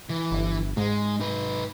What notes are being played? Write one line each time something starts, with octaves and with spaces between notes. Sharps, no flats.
E3
G1
G#2 G#3
D#4 B4